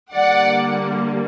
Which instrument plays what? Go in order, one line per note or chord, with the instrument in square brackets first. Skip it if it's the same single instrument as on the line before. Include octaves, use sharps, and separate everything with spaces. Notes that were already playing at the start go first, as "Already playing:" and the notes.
[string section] D3 G3 A#3 D5 F#5